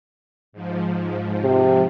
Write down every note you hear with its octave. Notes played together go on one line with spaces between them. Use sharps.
G#2 F3
C3